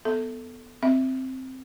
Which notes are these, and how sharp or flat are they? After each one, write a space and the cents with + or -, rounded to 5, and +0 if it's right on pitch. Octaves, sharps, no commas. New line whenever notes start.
B3 +0 A4 +0 E5 +0
C4 +0 E5 +0